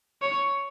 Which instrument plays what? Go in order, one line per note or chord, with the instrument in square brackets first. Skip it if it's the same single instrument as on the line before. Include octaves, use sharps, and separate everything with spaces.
[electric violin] C#5